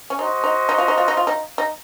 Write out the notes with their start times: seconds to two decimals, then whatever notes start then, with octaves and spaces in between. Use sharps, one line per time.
0.10 C#4
0.18 D#4 F#4 C5 D#5
0.44 D#4
0.69 D#4
0.78 F4
0.88 D#4
0.98 F4
1.08 D#4
1.17 F4
1.27 D#4
1.58 D#4